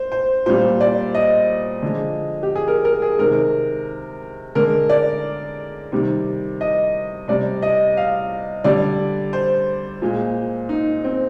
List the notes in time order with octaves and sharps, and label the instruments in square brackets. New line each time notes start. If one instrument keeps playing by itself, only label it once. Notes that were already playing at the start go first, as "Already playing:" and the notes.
Already playing: [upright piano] C5
C5
A#2 G3 C5
D5
D#5
D3 F3 G#3
G4
G#4
A#4
A#4
G#4
C3 D#3 G#3 A#4
D3 G#3 A#4
D5
C3 D#3 G3
D#5
C3 G3 D5
D#5
F5
D3 G3 D5
C5
A#2 G#3
D#4
C4